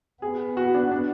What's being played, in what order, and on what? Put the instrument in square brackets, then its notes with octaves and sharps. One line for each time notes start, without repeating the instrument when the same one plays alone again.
[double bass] B3 [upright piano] G#4
[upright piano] F#4
D4
D4